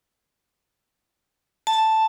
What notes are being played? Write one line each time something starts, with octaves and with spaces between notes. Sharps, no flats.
A5